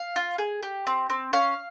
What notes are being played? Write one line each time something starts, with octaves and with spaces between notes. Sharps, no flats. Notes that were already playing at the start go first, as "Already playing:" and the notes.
Already playing: F5
F4
G#4
G4
C4
C4
C#4 F5